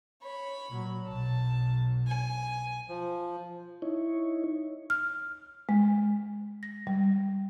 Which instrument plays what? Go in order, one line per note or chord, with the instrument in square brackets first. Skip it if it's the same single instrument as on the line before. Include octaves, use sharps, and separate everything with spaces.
[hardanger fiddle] C#5 B5
[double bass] A#2 F#3
[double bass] B1 [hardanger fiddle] A5
[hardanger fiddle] G#5
[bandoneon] F3
[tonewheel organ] D#4 E4 C#5
[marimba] F6
G#3
A#6
G3